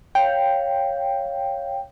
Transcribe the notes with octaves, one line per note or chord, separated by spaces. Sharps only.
C#5 F5 G5